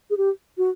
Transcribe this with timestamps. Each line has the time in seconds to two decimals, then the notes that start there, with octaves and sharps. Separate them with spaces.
0.10 G#4
0.17 G4
0.58 F#4